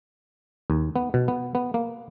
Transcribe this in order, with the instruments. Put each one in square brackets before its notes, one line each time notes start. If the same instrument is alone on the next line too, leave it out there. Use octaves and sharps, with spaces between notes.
[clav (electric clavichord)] D#2
B3
B2
B3
B3
A#3